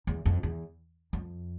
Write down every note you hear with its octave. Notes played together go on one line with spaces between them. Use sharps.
E2
F2
E2
F2